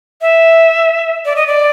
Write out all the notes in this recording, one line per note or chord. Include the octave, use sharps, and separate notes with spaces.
E5
D5
D#5
D5